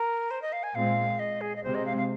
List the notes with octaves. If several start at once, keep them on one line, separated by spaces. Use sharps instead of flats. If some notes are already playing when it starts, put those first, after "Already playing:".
Already playing: A#4
C5
D#5
F5
G#5
A#2 G#3 C4 F5
D#5
G#4
D#5
C3 G#3 C4 C5
D#5
F5
F5